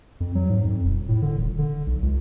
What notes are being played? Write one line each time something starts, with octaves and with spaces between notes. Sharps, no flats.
F2
F#3
G#2
F2
D#1
A2
D3
D#1
D3
B1
C#2